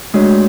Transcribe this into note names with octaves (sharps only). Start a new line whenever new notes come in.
G#3 A3 D4 F#4 C#5